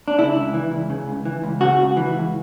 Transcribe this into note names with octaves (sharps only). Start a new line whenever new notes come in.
D4
C#3 E4
C#2
E3
C#2
C#3
C#2
E3
C#2
C#3 F#4
C#2
E3
C#2